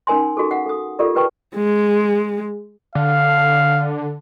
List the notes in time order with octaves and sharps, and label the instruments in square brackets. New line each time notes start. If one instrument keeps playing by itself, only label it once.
[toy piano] C#4 D#4 A#4 G#5 C6
D#4 F#4 G#4 A4
F5 F#5
A4 D#6
F4 G4 A4 A#4 D5 E5
G4 A#4 B4 G5 A5 C#6
[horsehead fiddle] G#3
[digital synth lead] D3 [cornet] F5